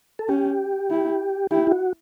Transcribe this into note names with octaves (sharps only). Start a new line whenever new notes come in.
A4
C#4 G4
E4
E4 G4
E4
F#4